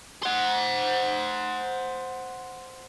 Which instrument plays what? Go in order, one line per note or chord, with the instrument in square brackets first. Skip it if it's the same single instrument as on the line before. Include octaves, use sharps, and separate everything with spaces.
[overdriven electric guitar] C5 F#5